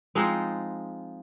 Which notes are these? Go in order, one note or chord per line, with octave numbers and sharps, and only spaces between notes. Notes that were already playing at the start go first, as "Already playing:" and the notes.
F3 G#3 C4 D#4